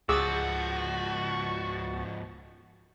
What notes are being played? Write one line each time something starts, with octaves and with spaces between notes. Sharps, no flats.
C#2 G#2 F3 F#4 G#4 D6 E6 A6